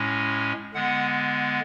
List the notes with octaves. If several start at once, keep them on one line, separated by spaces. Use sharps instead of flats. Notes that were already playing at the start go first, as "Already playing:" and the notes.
Already playing: A2 G#3 C#4
D3 G#3 B3 F#5